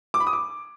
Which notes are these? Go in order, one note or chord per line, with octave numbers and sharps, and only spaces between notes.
D6
B5
D#6
D6